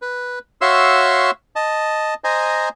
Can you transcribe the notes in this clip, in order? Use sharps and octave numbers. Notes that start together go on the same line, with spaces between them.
B4
F#4 C#5 E5 F5 C6 E6
D#5 A5
C5 D#5 G#5 A#5